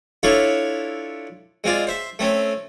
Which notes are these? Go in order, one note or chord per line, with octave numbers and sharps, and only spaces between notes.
D4 E4 F4 A4 C#5
G#3 C4 F4 D5
C5 E5
A3 C4 C#4